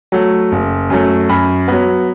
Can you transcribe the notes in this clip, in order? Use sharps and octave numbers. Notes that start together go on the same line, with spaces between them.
F#3 A3
F#1
F#2 F#3 A3
F#2 B5
F#3 B3